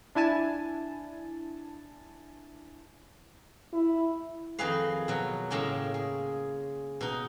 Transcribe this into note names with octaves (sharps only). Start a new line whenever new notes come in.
D4 E4 G#5 A5
E4
F2 D#3 D#4 G#4 B4 F5
B2 F#3
A2 C#3 G#3 A#3 G#4 G5
G#4
B2 D#4